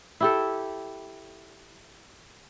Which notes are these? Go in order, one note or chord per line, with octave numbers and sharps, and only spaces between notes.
E4 G4 A4